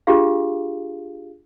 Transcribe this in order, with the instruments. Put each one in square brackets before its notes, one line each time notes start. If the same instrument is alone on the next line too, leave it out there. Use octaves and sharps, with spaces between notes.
[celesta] D4 F4 G4 G#4 F5